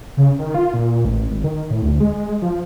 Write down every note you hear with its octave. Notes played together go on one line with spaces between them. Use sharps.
C#3
D#3
F4
A#2
A1
G#1
D#3
A2
D2
G#3
F3